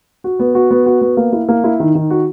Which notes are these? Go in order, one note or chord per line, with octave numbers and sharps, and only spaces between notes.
F#4
B3
F#4
B3
F#4
B3
A#3
E4
A#3
E4
D#3
D#3
F#4